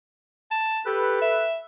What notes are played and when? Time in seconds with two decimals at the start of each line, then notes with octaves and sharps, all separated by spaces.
0.51 A5
0.86 G4 A4 B4
1.21 E5